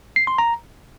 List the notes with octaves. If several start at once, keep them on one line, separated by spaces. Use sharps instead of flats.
C7
C6
A#5